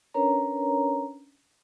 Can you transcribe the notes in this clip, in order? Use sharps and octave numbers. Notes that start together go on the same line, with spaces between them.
C#4 D4 A#4 B4 C#5 A#5